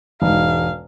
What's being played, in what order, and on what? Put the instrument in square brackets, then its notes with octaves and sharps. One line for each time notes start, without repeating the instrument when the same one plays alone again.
[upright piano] E1 G#2 [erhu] F5